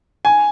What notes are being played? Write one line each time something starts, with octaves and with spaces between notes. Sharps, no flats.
G#5